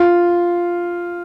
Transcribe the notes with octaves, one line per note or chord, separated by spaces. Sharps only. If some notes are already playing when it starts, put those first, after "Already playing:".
Already playing: F4